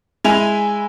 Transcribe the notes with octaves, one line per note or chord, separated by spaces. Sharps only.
G#3 E4 G#5 F7